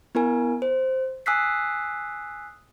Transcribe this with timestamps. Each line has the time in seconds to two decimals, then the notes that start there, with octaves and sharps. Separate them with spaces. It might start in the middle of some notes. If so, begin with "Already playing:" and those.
0.15 B3 E4 A#4 G#5
0.62 C5
1.26 G#5 D#6 E6 F#6 B6 C7